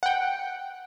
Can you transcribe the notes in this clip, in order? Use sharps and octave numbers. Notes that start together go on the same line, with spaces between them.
F#5 G5